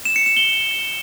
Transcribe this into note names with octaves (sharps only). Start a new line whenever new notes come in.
E7
C#7
E7
G7